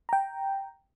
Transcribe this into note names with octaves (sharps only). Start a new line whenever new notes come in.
G5 A#5